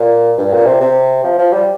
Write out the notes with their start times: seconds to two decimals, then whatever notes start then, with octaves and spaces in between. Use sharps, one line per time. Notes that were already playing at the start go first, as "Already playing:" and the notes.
Already playing: A#2
0.38 G2
0.53 A#2
0.66 C3
0.81 C3
1.24 F3
1.39 F3
1.53 G3